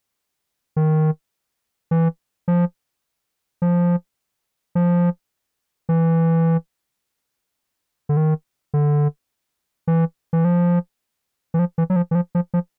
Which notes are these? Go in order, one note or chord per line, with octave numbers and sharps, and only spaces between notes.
D#3
E3
F3
F3
F3
E3
D3
D#3
D3
E3
E3
F3
E3
F3
E3
F#3
F3
E3
F3
F3
F3